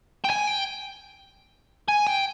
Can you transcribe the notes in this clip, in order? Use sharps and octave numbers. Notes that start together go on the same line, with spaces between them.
G5
G#5
G5
G#5
G5